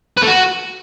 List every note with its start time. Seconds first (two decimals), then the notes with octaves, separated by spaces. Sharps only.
0.17 B4
0.22 A3
0.27 F#4